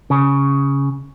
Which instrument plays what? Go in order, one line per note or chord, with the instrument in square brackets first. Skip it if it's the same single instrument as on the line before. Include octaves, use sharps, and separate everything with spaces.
[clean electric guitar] C#3